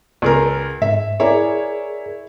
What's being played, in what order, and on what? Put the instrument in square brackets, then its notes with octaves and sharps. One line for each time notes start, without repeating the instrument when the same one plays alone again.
[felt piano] C#2 G#4 A#4
[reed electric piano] G#2 [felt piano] E5
[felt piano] E4 C#5 [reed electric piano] G#4 A#4 D5